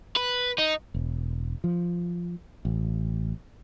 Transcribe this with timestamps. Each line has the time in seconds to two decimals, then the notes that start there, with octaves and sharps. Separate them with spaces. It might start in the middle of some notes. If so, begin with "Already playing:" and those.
0.16 B4
0.58 D#4
0.94 E1
1.64 F3
2.65 A1